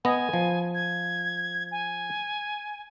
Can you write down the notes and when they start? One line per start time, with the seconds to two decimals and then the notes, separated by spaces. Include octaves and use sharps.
0.05 B3 D#5 G#5
0.33 F3
0.74 G#6
1.72 G#5